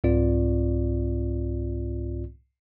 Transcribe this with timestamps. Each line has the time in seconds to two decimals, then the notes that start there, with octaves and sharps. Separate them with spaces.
0.04 C2 G#2 C4 F4 D5